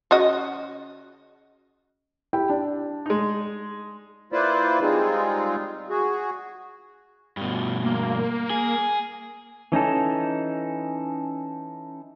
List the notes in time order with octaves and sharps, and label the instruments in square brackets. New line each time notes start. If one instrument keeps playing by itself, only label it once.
[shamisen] C#3 F#4 D#5
[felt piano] E4 G4 G5
D4
[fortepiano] G#3 D#4
[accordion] A#3 E4 F4 B4 C5 D5
G3 G#3 C4 D#4 F4 G#4
F#4 G#4
[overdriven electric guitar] G2 B2
[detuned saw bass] A#3
[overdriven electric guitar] G#4
[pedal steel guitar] E3 C#4 D#4 A4